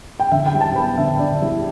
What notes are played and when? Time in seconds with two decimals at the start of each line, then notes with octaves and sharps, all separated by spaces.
0.20 G5
0.31 D3 E5
0.46 G5
0.54 G3
0.61 A5
0.75 B3 B5
0.97 D3 E5
1.19 D3 D5
1.41 G3 E4